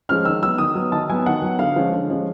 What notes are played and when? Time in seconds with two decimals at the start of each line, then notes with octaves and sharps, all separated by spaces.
0.09 F3 G#3 C#4 F6
0.25 D#3 E6
0.42 F#3 B3 E6
0.58 D#3 D#6
0.75 F#3 B3
0.92 D#3 A5
1.09 F#3 B3 G#5
1.26 D#3 F#5
1.42 F#3 B3
1.59 D3 F5
1.76 F3 G#3 C#4
1.92 D3
2.09 F3 G#3 C#4